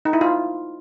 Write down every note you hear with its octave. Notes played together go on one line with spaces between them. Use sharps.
D#4
E4
F4